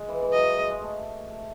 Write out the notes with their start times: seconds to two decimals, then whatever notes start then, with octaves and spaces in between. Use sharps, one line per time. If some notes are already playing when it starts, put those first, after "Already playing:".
Already playing: G#3
0.09 E3
0.22 E3
0.32 F#3 D#5
0.58 G#3
0.70 G#3
0.82 A3